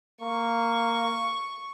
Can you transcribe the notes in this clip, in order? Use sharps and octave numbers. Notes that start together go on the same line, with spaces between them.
A#3 C#6